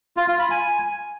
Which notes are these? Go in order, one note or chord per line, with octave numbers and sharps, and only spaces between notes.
F4
F4
B5
G#5